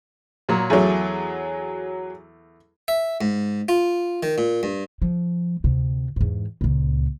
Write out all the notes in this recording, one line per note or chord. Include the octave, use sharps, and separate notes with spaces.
A#2 F#3
E2 F#3 A3 G#4
E5
G#2
F4
D#3
A#2
G2
F3
D2 C3
E2 G#2
C#2 A#2